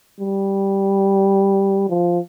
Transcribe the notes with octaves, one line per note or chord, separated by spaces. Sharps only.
G3
F3